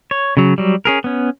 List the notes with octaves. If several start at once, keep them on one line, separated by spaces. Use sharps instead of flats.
C#5
C#3 F#3
F#3 G3
C#4 G#4 A#4
B3 C#4